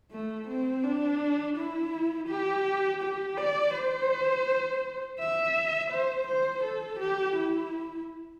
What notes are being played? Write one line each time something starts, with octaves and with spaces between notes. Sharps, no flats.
A3
C4
D4
E4
G4
G4
D5
C5
E5
C5
C5
A4
G4
E4